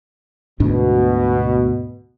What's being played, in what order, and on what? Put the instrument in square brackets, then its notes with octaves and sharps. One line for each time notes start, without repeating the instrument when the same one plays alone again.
[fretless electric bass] D2 G#2 D4 [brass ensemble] B2